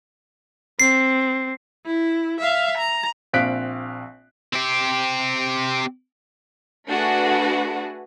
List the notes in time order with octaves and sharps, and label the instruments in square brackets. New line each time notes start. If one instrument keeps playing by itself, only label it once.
[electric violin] C4 [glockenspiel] C7
[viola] E4
E5 F5
A#5
[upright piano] A#1 C4 F5 F#6 B6 D7
[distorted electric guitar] C4 G4
[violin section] A3 D4 F#4 G#4 B4